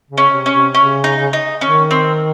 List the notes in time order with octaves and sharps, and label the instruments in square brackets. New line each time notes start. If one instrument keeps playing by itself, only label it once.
[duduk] C#3
[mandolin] C#4
[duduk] C3
[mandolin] C#4
[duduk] C3
[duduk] C#3 [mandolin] C#4
[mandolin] D#4
D#4
[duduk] D#3 [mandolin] C#4
[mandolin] C4